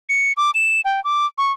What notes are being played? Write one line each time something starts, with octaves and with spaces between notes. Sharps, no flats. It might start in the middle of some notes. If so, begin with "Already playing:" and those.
C#7
D6
E7
G5
D6
C#6